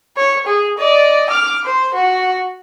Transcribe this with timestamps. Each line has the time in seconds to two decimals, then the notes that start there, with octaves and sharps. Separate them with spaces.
0.17 C#5
0.46 G#4
0.78 D5 D#5
1.30 D6 F6
1.65 C5
1.94 F#4